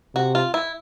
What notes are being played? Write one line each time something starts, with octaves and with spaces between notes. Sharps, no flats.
C3 F#4
F4
E4